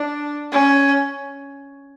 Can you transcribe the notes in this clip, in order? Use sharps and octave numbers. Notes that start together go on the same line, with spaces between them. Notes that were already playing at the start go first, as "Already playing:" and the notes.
Already playing: D4
C#4